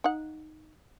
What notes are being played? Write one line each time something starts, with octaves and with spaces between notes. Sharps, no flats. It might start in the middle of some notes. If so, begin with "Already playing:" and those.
D#4 F#5